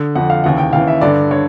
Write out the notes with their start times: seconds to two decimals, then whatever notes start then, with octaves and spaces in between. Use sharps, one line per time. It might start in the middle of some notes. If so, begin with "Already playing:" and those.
Already playing: D3
0.15 F2 D3 F#5
0.30 F5
0.44 D#2 C#3 E3 F#5
0.58 G5
0.73 D#2 C#3 E3 F5
0.87 E5
1.01 G2 D3 D5
1.31 D3 C#5